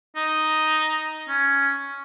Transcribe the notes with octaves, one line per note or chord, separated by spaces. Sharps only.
D#4
C#4